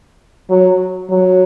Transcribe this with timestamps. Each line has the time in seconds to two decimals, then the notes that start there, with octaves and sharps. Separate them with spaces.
0.50 F#3
1.10 F#3